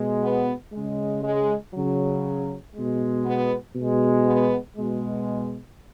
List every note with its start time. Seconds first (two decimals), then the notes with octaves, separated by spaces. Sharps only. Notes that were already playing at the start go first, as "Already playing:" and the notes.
Already playing: B2 G#3
0.23 B3
0.73 C#3 G#3
1.24 G#3
1.74 C#3 F#3
2.75 B2 G#3
3.25 B3
3.75 B2 G#3
4.26 B3
4.77 B2 G#3